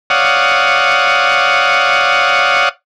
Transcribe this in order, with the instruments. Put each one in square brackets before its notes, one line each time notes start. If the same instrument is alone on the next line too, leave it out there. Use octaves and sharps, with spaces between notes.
[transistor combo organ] C#5 D5 F5 F#5 D#6